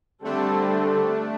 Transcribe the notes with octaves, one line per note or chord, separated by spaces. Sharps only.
D3 G3 A3 C4 D4 A4